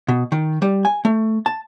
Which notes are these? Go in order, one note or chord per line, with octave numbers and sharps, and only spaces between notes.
B2
D#3
G3
G#5
A3
A5